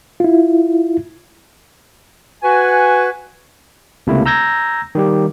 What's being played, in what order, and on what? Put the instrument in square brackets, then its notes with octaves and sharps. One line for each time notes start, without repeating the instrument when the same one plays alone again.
[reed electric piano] E4 F4
[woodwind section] F#4 B4 G#5
[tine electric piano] C#2 C3 A3 A#3 E4
A#5 E6 G6 G#6 A#6
D#3 G3 G4